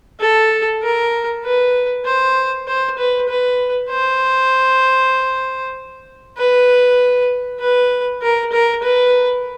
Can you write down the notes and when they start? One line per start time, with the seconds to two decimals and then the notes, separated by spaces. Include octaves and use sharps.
0.20 A4
0.83 A#4
1.45 B4
2.05 C5
2.67 C5
2.98 B4
3.29 B4
3.90 C5
6.37 B4
7.60 B4
8.22 A#4
8.52 A#4
8.83 B4